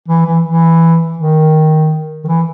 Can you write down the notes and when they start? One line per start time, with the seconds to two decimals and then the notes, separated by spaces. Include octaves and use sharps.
0.08 E3
0.26 E3
0.45 E3
1.18 D#3
2.24 D#3
2.28 E3